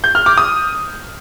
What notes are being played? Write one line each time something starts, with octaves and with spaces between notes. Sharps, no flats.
G6
F6
D6
D#6